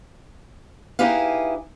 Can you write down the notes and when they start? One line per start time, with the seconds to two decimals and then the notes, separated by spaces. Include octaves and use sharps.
0.99 D#4 E4 G4 G#4 B4 F5